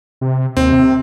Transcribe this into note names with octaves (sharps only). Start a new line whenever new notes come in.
C3
D#2 C4
C3